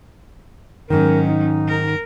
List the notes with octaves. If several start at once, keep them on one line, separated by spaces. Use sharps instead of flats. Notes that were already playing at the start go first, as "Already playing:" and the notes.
G#2 D#3 F#3 C#4 A#4
D#4
A#4